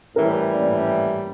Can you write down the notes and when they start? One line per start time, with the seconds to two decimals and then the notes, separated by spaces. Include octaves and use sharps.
0.16 A2 E3 G3 A#4
0.53 D5